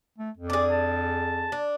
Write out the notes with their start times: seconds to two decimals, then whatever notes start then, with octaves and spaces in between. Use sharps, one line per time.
0.19 A3
0.37 F2
0.50 D4 G#4 D5
0.72 A5
1.52 D4